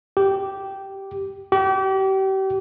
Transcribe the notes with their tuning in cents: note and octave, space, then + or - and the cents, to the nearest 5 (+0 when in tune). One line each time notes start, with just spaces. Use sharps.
G4 -10
G4 -35